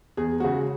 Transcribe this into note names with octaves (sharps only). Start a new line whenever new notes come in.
E2 G#4
C#3 G#3 F#4